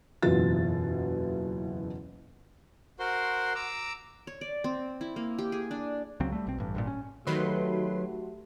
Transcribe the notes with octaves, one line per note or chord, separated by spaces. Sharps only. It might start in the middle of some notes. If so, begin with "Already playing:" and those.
F#1 E2 B2 F4 A6
F#4 A#4 C5 C6
A#5 D6 E6
C#5
D5
C4
E4
A#3
G4
G#4
D4
C#2 C#3 F#3 C4
G3 A3
B1 C4
A1 G2
G#1 G2 A#2
C#4
D#3 F#3 A3 F#4 G4 B4 C6